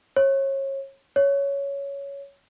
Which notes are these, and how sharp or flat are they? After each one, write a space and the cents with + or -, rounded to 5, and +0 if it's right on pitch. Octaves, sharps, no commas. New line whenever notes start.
C#5 -30
C#5 +10